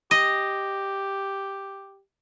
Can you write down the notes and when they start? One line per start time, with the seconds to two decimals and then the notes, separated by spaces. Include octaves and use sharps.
0.11 G4 D#5